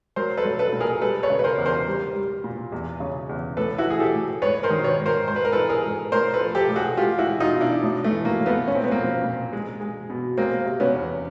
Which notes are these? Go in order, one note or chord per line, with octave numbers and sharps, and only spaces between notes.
F#3 A#4 C5
A4 B4
F#3
A4 B4
A#2
G#4 A#4
G3 A4 B4
B4 C#5
C#3
B4
A#4 C5
E2
A#4 C5
G3
G3
A#2
E2
C#3
E2
A2 A4 B4
E4 F#4
E3
G#4
G4 A4
A2
G#2 B4 C#5
A#4 C5
D#3
B4 C#5
G#2
A#4 C5
G#2 C5
B4
A#4
E3 A4 B4
G#4 A#4
G#2
A2 A#4 C5
A4 B4
F3
G4 A4
A2
F#4 G#4
G#3 F4 G4
E4 F#4
G#3
D#4 F4
B2
D4 E4
A2
A3
E3
A#3
A2
A3 B3
A#2 C#4
C4
B3
F3 A#3 C4
A#2
G#3
G#3
B2
G#3 A#3 C4
C3
B3 C#4
E2